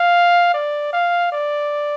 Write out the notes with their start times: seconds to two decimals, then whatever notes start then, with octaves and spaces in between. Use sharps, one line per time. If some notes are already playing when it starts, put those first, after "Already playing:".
Already playing: F5
0.54 D5
0.93 F5
1.32 D5